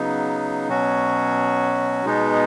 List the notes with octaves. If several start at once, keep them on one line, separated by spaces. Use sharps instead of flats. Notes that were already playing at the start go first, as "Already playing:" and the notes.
Already playing: C#3 F#3 B3 D#4
B2 F#3 C#4 F#4
B2 G#3 B3 D#4